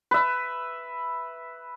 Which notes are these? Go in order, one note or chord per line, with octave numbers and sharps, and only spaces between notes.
B4 E5